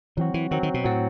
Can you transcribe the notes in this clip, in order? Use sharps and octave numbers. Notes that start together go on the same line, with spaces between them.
E3 F#3 C4 F#4
E3
D#3 F#3 C4 F#4
D#3
B2
A2 F#3 C4 F#4